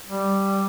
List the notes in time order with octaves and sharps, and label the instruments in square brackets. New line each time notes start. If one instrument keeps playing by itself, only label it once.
[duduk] G3